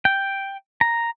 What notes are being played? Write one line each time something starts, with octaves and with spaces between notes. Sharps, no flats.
G5
A#5